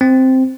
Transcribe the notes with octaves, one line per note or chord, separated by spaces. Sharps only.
C4